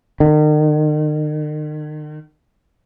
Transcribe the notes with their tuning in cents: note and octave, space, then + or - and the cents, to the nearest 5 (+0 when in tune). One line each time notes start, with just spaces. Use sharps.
D#3 -40